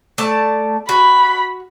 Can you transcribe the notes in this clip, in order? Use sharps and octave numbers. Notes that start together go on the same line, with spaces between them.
A3 D5 A5
F#4 B5